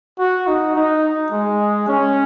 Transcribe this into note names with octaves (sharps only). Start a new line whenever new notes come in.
F#4
D#4
D#4
G#3
C#4